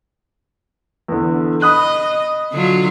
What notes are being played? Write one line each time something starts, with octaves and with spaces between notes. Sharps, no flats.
E2 D3
D#5 B5 D#6 F#6
D3 F#3 F4